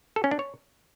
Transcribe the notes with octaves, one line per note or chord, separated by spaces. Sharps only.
A4
C#4
D4
C#5